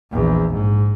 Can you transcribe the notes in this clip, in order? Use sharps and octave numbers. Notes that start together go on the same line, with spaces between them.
A#1 E2
G#2